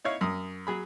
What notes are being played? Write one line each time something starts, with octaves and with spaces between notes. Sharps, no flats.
D#4 E4 C#5 F5
F#2 D#6
F#3 G#4 B5